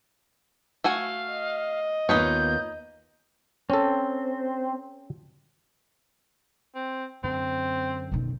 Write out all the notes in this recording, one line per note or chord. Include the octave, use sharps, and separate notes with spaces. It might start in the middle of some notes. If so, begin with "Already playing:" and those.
A3 F#4 F5 G#5
D#5
D#2 B3 D#4 F4 B4 C#5 G6
C4 C#4 A4
C4
F#2 D3 C4
B2 D#3